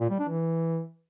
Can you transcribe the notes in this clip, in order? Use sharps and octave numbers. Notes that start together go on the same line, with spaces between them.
A#2
G3
D4
E3